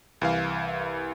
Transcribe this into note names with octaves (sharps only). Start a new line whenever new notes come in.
C2 E3 F5